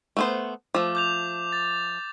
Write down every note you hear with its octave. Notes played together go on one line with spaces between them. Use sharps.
A3 B3 C5
F3 A3 D6
D6 G6 F7
A6